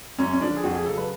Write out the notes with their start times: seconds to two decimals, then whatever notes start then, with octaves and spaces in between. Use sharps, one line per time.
0.18 F#2 C#4
0.33 C#4
0.41 D3 F3 D4
0.56 G#4
0.63 F2 F#4
0.75 G#4
0.86 C#3 F#3 A4
0.97 B4